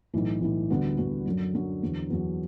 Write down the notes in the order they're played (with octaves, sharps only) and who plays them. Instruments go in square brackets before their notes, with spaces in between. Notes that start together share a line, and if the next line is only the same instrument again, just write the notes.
[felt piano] B1 A2 E3
B1 A2 E3
D2 D3 G3 B3 F#4
D2 D3 G3 B3 F#4
F#2 D3 F#3
F#2 D3 F#3
E2 D3 F#3
E2 D3 F#3